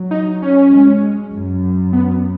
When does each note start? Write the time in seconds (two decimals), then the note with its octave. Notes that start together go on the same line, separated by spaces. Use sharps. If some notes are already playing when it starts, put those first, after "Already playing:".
Already playing: F#3
0.11 D#4
0.42 C#4
0.72 G#3
1.32 F#2
1.93 B3